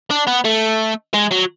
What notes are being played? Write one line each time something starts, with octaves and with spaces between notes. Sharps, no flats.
D4
B3
A3
G#3
F#3